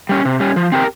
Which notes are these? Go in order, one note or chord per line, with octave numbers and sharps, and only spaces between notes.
G3 C#4
C3
G3 C#4
F3
C4 G4 A#4